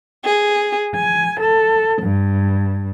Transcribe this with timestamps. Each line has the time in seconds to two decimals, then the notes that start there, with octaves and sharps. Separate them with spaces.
0.25 G#4
0.94 G#5
1.39 A4
2.02 G2